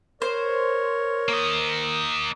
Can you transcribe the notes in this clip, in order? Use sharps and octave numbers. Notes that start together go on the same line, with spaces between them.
A#4 C5 C#5
A#3 D#5